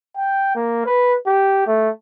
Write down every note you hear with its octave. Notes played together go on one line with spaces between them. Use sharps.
G5
A#3
B4
G4
A3